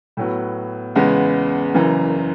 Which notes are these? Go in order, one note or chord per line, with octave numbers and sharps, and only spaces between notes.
A2 F#3 B3
E2 C#3 G#3 B3
F#1 F#2 C#3 E3